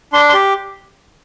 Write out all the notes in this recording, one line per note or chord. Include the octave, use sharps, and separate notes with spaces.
D4 C6
C6
G4